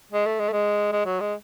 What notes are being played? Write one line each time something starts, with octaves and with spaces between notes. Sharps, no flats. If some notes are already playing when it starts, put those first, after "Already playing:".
G#3
A3
G#3
A3
G#3
G#3
F#3
G#3